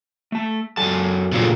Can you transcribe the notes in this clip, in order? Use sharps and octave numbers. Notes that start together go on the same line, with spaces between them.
A3 A5
F#2 F#3 A4 G#5 A5
A#2 C#3 A3 C#4 F4